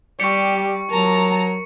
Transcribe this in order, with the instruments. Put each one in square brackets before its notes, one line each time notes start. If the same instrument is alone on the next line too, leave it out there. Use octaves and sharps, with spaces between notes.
[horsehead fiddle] G3 D5 [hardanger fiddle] G4 [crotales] C#6 C#7
[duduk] F#3 [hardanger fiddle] A#4 [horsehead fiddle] A5 A#5